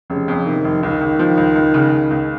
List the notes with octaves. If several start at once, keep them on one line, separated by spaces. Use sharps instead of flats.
F1 C#3
F2
C3 D#3
F1
C#2 D#3
C#2
F3
C#2
C#2
C#3
C#2
C#2